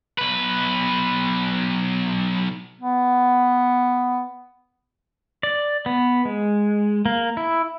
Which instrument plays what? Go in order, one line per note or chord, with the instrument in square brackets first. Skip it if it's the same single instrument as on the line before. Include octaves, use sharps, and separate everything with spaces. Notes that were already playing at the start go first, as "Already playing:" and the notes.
[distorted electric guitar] B1 B4
[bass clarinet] B3
[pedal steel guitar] D5
B3
G#3
A#3
E4